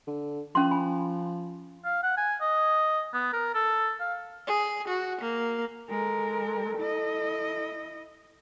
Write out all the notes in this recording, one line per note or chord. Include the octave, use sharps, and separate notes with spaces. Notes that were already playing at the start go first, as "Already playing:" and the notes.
D3
F3 C#4 C6
G#5 B5
F5
F#5
G#5
D#5
B3
A#4
A4
F5
G#4
F#4
A#3
G#3 A4 A#4
E4 D#5